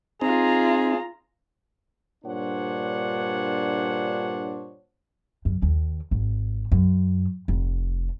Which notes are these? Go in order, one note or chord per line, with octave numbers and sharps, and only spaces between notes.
C4 D#4 F4 G#4 A#5
G2 A#2 D4 C5 C#5 F#5
F#2
D#2
G#1
F#2
F1